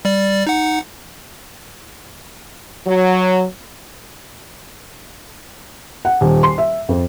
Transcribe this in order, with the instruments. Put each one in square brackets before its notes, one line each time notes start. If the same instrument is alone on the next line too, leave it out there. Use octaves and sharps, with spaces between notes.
[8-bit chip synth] G3 D5
D#4 F#5
[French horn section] F#3
[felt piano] F#5
D#1
C6
E5
F2